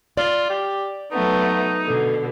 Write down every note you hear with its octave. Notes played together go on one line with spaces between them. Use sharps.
F4 D5
G4
F#3 A3 B3 D#4
B2 D3